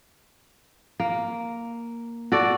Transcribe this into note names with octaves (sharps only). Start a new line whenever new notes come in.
A#3
F#4 A4 D5